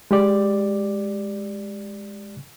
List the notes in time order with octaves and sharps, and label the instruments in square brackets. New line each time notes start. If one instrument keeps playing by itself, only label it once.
[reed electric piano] G#3 G4 D5